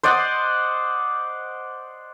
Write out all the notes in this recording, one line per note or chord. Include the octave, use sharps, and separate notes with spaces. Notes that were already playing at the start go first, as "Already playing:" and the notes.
C5 D5 D#5 F#5